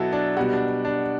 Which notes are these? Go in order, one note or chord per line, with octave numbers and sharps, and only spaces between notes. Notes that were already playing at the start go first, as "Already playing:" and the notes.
Already playing: B2 F#3 E4 F#4 A4
D4
B2 G3 F#4
D4
D4